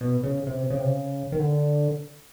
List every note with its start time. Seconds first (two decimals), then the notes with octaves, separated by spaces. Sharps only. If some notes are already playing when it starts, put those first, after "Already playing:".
0.01 B2
0.24 C#3
0.47 C3
0.70 C#3
0.77 C3
0.85 C#3
1.32 D#3
1.39 D3